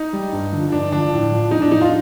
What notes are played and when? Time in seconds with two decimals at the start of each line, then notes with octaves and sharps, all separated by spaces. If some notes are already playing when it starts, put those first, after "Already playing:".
Already playing: D#4
0.13 G3
0.33 G2
0.53 D3 F3
0.72 G2 D4
0.92 D3 F3 D4
1.12 A2
1.32 F3
1.51 A2 D#4
1.62 D4
1.72 F3 D#4
1.81 F4